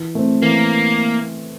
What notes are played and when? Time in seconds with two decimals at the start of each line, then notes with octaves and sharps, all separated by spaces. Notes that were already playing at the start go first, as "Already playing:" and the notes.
Already playing: E3
0.15 A3 C4
0.42 E3 A#3